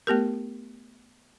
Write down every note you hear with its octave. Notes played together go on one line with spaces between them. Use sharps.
A3 B3 G4 A#4